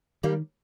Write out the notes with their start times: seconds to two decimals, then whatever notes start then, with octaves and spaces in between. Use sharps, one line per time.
0.23 D#3 G3 A#3